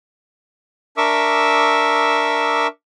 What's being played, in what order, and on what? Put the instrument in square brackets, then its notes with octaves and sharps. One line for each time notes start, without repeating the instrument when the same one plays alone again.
[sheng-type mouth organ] D4 A#4 E5 C#6 D6 E6